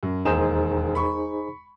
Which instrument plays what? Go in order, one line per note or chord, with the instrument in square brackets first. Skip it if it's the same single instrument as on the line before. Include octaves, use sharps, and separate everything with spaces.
[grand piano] F#2
[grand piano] E1 D#2 E7 [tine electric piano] D#4 G#4 C5
[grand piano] B5 C#6